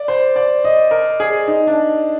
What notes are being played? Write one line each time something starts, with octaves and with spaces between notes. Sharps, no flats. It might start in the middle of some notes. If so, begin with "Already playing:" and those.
Already playing: D5
C5
D5
D#5
A#4
G#4
D#4
D4